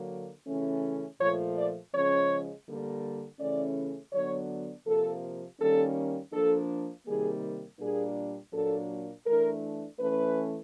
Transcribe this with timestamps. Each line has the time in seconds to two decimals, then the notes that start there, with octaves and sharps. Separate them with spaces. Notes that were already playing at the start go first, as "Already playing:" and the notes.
Already playing: D3 F#3 A#3
0.47 C#3 E3 A3 C#4
1.20 A#2 F3 A3 C#5
1.56 D5
1.94 C#3 F3 G#3 C#4 C#5
2.67 D3 G3 A#3
3.40 C#3 E3 A3 C#4 D5
4.13 D3 F#3 B3 D4 C#5
4.87 C3 F3 A#3 A4
5.60 D#3 G3 A#3 C#4 A4
6.33 F3 A#3 D4 A4
7.07 C3 D#3 G3 A#3 G#4
7.80 A#2 G3 A#3 D4 G#4
8.53 A#2 F#3 A#3 D4 A4
9.26 E3 A3 D4 A#4
10.00 E3 A3 C#4 B4